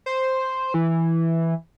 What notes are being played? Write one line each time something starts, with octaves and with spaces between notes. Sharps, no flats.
C5
E3